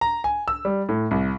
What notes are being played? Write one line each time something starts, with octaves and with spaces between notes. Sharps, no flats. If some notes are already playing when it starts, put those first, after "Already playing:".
A#5
G#5
E6
G3
A2
C2